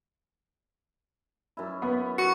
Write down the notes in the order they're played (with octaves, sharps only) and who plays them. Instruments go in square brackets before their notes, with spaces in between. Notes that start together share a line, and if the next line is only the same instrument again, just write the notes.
[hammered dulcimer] F#2 E4
[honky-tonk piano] B3 B5
[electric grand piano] F#4 [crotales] C#6 C#7